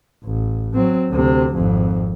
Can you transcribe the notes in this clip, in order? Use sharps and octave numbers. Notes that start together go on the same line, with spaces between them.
A1
F#3 C4
D2 C3
G#1 F2